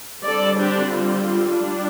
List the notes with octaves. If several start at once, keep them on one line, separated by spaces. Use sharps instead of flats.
D3 G3 C4 A4 D5
D4 G4
F4
G3 D4